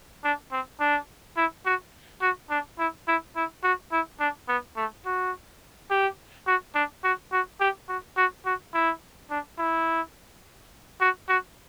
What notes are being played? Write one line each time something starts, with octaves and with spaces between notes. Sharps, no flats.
D4
C4
D4
E4
F#4
F#4
D4
E4
E4
E4
F#4
E4
D4
B3
A3
F#4
G4
F#4
D4
F#4
F#4
G4
F#4
F#4
F#4
E4
D4
E4
F#4
F#4